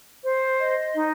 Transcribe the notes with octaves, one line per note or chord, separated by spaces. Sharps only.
C5
D#5
D#4